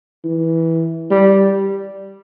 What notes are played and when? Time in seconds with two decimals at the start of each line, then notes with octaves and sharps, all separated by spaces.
0.24 E3
1.11 G3